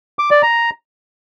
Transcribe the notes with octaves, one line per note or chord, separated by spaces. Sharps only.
D6
D5
A#5